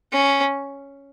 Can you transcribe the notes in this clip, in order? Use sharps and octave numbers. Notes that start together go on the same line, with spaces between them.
C#4